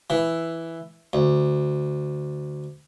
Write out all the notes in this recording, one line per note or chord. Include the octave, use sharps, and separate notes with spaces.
E3
D2